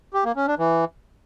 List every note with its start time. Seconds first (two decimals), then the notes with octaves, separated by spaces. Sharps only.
0.14 G4
0.25 A#3
0.36 C#4
0.47 D4
0.59 E3